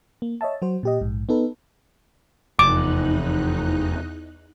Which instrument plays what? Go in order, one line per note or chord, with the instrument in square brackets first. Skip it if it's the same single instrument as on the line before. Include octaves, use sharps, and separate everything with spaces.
[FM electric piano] A#3
C#5 D#5 E5 A5
F#3 F#4 C5
A#2 G4 D#5
A#1 G#2
B3 D#4 A4 B4
[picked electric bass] F1 [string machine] E2 D#4 F#6 [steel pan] D6